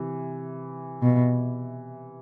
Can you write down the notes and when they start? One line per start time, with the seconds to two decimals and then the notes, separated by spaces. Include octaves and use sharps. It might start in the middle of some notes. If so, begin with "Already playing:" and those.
Already playing: C3 E3
1.03 B2